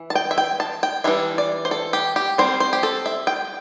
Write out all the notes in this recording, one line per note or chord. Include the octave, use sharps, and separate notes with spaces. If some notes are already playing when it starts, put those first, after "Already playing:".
Already playing: E3
A5
G5
E5
G5
A5
G5
E3 G3 D4 E5
D5
C5
A4
G4
G4
G3 C4 C5
C5
G4
A4
E5
G5